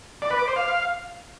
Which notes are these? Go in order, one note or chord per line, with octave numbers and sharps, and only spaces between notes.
D5
B4
D6
C5
F5